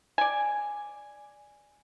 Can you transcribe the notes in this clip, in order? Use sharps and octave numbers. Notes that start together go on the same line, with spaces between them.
D5 G#5